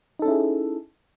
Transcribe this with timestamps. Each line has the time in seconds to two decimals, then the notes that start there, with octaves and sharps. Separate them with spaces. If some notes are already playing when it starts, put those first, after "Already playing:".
0.19 D#4
0.22 A4
0.25 C#4
0.28 E4
0.31 G#4